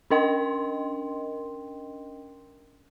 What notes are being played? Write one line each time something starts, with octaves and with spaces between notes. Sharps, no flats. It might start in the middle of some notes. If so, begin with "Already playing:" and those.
C#4 D4 A#4 D#5 G5 C6